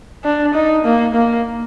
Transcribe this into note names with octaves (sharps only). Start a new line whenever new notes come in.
D4
D#4
A#3
A#3